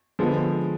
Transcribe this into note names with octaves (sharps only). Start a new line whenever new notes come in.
D3 F3 G#3 B3